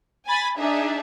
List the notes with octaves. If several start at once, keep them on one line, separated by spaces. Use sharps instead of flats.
G#5 B5 A6
D4 D#4 G#4 E5